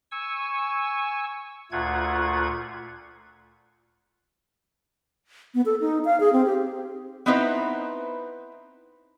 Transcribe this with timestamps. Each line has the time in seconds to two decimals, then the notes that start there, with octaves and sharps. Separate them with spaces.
0.12 G#5 C#6 E6
1.72 D2 A#2 A3 F4 F#5 G#6
5.54 B3
5.66 A4
5.81 D#4
6.05 F5
6.20 G#4
6.33 C4
6.45 G4
7.26 B3 C4 D#4 E4 B4 C5